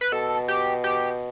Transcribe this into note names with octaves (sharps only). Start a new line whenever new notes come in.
B4
B2 A4
G4
G4